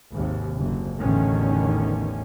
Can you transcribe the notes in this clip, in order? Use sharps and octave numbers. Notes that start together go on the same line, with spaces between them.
G#1 D#2 C3
F#1 D3
A1 E2 D3 D#3 C#4